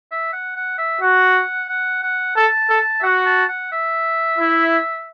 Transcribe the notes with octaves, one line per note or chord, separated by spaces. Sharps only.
E5
F#5
F#5
E5
F#4 F#5
F#5
F#5
A4 A5
A4
E5
F#4 F#5
A5
F#5
E5
E4